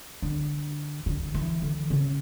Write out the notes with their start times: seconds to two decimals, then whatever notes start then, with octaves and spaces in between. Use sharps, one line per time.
0.22 D3
1.06 D3
1.34 E3
1.62 D3
1.90 C#3